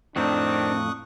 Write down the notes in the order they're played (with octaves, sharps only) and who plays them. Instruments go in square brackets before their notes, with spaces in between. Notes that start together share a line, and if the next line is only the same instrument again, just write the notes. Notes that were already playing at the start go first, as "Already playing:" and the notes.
[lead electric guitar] F2 A2 [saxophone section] D#3 C4 [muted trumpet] D4 [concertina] C#6 D#6 F#6